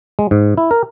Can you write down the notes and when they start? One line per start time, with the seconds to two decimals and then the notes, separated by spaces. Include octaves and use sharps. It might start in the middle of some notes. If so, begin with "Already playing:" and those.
0.19 G#3
0.31 G#2
0.58 E4
0.71 A#4